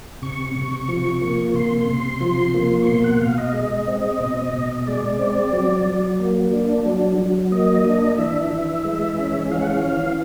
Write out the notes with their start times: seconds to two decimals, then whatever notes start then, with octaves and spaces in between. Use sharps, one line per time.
0.22 C3 C#6
0.55 C3
0.88 F3
1.22 A#3
1.54 C3 C6
1.89 C3
2.21 F3
2.54 A#3
2.82 C#6
2.87 B2 C6
3.04 F#5
3.21 B2 F5
3.38 D#5
3.53 G#3
3.87 C4
4.21 B2
4.53 B2
4.87 G#3 D5
5.19 C4
5.53 F#3
5.86 F#3
6.20 A#3
6.52 D4
6.86 F#3
7.18 F#3
7.52 A#3 D#5
7.84 D4
8.18 E3 E5
8.51 E3
8.85 G#3
9.18 C#4
9.51 E3 F5
9.59 F#5
9.68 F5
9.83 E3